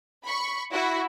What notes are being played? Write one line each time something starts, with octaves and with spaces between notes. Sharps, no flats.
B5 C#6
E4 F#4